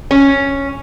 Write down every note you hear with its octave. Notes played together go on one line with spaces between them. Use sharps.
C#4